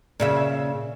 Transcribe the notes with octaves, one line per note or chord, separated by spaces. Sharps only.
A#2 C#3 E5